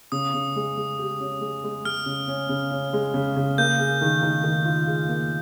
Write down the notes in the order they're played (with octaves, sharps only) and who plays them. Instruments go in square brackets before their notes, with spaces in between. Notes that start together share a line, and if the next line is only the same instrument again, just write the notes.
[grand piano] C#3 [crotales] D#6
[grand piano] C#3
G#3
G#3
G4
C#4
G#3
G#3
[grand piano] G#3 [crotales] F6
[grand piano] C#3
C#4
C#3
C#4
G#3
C#3
C#3
[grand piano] A#3 [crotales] G6
[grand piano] G#4
D#3
D#3
D#3
F4
G#4
A#3